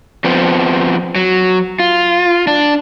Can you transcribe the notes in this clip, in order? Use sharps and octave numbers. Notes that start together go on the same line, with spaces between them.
F3 B3 C4
F#3
F4
D4